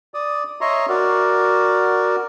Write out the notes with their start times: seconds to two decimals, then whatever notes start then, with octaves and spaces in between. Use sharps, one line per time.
0.14 D5 D#6
0.61 C#5 D#5 E5 A#5 C6 C#6
0.89 F#4 A#4 D5